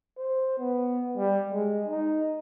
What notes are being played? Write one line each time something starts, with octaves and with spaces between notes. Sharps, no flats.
C5
B3
G3
G#3
D#4